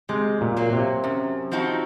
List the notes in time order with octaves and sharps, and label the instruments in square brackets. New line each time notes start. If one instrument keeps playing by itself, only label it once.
[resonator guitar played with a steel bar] C3 [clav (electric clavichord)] G#3
[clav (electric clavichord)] A#2
[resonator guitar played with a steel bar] F#3 A#3
[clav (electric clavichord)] C3
[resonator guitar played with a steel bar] F#2
F3 C4 D#4 F#4